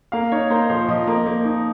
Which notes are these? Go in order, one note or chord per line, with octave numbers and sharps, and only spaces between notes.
A#3 F5
D#4 C#5
A#3 C5
F3 C5
F3 D#5
A#3
A#3
D#4